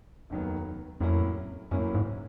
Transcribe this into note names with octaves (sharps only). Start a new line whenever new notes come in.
F1 D#2 D#3 F#3 B3
F2 A2 F#3 A#3 C#4 E4
F#2 A2 F#3 A#3 C#4 E4
G#2